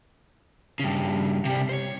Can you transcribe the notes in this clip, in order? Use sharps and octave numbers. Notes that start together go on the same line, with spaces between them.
G2 C#3
C3 G3
C5 C#5